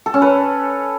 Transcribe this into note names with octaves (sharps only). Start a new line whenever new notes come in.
A4
C#4
B4